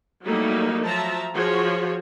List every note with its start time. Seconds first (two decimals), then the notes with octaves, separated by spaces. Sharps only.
0.24 F#3 G3 A3 A#3 D#4 E4
0.83 F3 F#3 E5 A5 A#5
1.34 F3 F#4 G#4 C#5